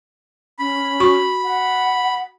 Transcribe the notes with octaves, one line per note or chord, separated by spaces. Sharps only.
C#4 B5
F#4 C#6
F#5